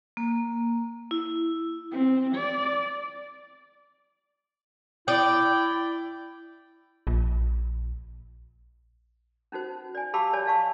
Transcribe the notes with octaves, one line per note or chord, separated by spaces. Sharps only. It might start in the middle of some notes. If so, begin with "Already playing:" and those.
A#3
E4
C4
D5
E4 D5 G5
A#1
C#4 D#4 F#4 C5
D5 G#5
G4 F5 A5 B5 D6 E6
C#5 D5 G#5 A5
D#5 F5 A5 C#6